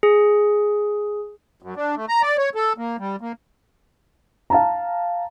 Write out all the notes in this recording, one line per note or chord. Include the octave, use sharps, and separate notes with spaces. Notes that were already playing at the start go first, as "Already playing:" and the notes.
G#4
F#2
D4
A3
A#5
D5
C#5
A4
A#3
G3
A#3
F5 A5 A#5